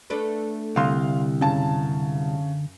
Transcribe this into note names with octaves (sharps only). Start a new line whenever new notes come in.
A3 D4 B4
C2 D3 F5 C6
F#2 C#3 A5